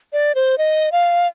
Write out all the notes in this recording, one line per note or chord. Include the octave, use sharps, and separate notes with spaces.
D5
C5
D#5
F5